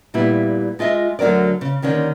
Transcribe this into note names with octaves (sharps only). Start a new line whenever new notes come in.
A#2 G3 B3 E4
G#3 F4 D#5 E5
D2 D3 F#3 A#4 D5
C#3
D#2 D3 D#3 C#4